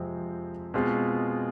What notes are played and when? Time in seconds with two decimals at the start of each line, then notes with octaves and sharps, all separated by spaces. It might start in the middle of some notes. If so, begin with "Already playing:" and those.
Already playing: F2 C3 F3 G#3 C4
0.74 B2 G#3 C4 F4 G#4